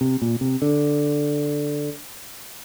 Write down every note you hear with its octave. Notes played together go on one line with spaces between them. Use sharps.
C3
A#2
C3
D3